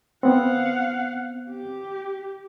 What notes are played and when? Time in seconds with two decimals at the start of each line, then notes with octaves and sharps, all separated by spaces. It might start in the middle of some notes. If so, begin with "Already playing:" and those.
0.23 B3 C4 F5 F#5
1.50 G4